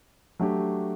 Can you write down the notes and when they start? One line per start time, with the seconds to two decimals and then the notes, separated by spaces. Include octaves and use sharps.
0.39 F#3 A3 D4 G4